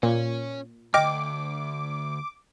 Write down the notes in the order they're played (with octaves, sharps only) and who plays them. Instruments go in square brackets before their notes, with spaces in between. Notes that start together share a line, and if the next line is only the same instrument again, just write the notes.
[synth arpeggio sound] A#2 [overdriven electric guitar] C#4
[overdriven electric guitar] D2 G#2 [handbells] D#5 G5 F6 [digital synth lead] D6